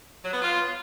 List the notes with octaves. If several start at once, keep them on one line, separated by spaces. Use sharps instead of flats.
F#3
B3
F4